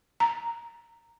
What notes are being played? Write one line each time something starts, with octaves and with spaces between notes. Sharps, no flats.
A#5